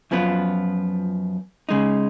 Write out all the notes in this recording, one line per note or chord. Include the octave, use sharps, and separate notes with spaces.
F#2 F3 B3 F4
C#3 G#3 D#4